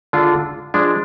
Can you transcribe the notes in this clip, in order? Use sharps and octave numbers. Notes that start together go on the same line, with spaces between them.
D3 G#3 D4 F4
F3 G#3 D4